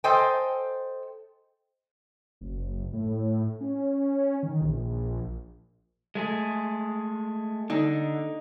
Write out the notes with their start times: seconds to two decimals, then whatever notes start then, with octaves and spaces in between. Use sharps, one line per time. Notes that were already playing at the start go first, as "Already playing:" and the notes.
0.04 A4 C5 D#5 G5 G#5
2.41 F#1
2.93 A2
3.61 C#4
4.43 D#3
4.61 A#1
6.15 G#3 A3 G#4
7.70 D3 D#4